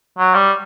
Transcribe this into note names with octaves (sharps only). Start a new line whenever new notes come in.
F#3
G3